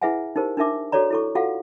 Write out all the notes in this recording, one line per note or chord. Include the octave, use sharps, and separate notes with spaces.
E4 G#4 B4 E5 F#5 G#5
D#4 G4 A#4 C5
D4 D#4 A#4 E5 D6
F#4 A4 C#5 D5 A#5
E4 A4 C#6
F4 F#4 A4 F5 F#5